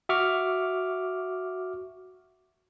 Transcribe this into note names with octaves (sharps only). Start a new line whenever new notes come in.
F#4 E5 C#6 D6 F6